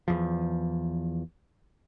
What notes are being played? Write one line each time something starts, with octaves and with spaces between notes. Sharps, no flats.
E2 F3